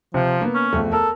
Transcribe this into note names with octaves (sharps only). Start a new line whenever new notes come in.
C3 F3
A#3 B3
C#4
E1 F2 A3
A4 A#4